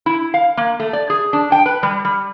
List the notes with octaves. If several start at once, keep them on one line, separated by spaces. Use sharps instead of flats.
E4
F5
A#3
A3
D5
G#4
D4
G5
B4
G3
G3